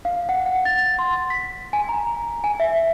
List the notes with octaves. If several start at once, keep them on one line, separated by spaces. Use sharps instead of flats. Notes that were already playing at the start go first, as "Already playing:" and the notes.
F5
F#5
F#5
A6
C6
B6
G#5
A#5
G#5
E5